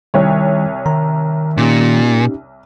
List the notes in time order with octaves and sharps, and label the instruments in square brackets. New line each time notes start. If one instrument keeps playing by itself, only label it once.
[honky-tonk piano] C2 C#5 [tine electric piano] D#3 G3
[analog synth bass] D#3 [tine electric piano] A#5
[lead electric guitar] A#2 [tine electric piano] C#4 D#4 G4